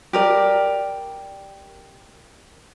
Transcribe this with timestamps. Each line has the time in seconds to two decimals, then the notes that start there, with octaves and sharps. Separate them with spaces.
0.13 G4 A#4 D5